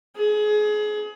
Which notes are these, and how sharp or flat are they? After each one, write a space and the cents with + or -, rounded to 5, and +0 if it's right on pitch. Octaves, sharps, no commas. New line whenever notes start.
G#4 +25